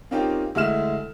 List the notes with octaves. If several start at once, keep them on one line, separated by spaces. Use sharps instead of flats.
A#3 C4 C#4 D#4 F4 G4
D2 G#3 E4 F6 E7